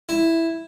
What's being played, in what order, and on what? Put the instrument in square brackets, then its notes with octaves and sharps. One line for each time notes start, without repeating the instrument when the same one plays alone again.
[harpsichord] E4